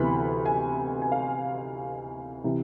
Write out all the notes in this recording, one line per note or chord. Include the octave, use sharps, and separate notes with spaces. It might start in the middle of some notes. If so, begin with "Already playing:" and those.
Already playing: D2 C3 E3 B3 B5
G#5
G#5
F5
C3 E3